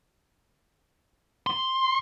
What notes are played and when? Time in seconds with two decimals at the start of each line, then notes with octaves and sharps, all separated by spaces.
1.47 C6